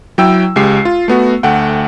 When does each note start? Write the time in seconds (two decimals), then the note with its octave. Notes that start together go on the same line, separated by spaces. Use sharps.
0.18 F#3 E4 G5 E6
0.56 C#2 G#3 G4 C7
0.85 F4
1.08 A3 B3 F#4
1.43 D2 A3 F#5 G5